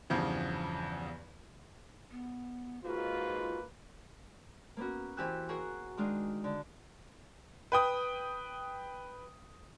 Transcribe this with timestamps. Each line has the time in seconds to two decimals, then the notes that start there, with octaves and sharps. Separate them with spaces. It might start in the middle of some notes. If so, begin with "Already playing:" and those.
0.10 E2 G2 C#3 F3
2.11 B3
2.84 G#2 A#3 F4 F#4 B4
4.77 A#3 B3 C#4 F#4
5.17 E3 C4 G4 G#5 E6 F#6
5.49 F#4 G#4 A#4 C#5 F#5
5.97 D#3 G#3 D4 D#5 F5
6.44 D3
7.72 B4 G5 D#6